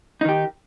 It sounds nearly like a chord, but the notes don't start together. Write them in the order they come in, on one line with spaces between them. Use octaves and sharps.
D#4 D#3 G4